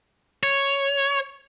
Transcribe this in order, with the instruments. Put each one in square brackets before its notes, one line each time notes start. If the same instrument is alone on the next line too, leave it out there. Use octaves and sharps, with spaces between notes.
[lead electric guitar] C#5